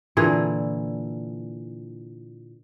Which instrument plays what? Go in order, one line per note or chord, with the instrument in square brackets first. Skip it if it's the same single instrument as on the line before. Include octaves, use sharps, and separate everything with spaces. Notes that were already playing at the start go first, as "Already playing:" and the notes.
[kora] A#2 D3 E3 G#4